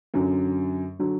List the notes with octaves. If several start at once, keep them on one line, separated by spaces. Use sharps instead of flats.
F#2 D3 F#3
D3 F#3